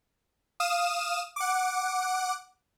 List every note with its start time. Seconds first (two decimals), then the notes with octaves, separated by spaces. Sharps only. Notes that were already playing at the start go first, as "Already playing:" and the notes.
0.60 F5 D#6 E7
1.36 F#5 D6